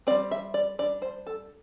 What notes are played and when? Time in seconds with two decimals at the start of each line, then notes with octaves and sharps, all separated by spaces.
0.07 C4 D5
0.11 G3
0.31 E5
0.54 D5
0.79 G3 D4 D5
1.02 C5
1.27 A4